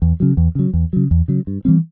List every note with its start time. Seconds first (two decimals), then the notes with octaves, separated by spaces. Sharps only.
0.02 E2
0.20 C#3 F#3
0.37 E2
0.55 C#3 F#3
0.74 E2
0.93 C#3 F#3
1.11 E2
1.28 C#3 F#3
1.47 G2
1.65 E3 G3 C4